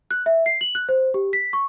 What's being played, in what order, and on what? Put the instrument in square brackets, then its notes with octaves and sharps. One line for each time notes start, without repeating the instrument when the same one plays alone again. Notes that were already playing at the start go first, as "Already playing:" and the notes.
[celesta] F#6
E5
C7
F#7
F#6
C5
G4
B6
C#6